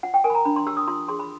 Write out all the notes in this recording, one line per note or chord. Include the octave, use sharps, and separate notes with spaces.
F4 F#5
G5
A#4 G#5
B5
A#5
D4 B5
C6
G4 E6
D#6
F4 C6
G#4 C6
B5